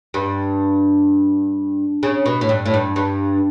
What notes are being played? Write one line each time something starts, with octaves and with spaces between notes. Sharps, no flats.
G2
C#3
B2
A2
G2
A2
G2
G2